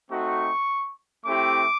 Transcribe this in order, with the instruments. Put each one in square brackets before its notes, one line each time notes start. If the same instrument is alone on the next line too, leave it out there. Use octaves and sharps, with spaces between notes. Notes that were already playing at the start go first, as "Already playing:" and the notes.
[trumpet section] A3 C4 D#4 F#4 C#6
A3 C4 E4 G4 D6